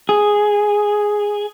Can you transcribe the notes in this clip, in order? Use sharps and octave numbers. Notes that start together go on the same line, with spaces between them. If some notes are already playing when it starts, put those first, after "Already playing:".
G#4